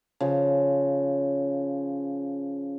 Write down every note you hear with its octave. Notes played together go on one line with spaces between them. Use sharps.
C#3 F3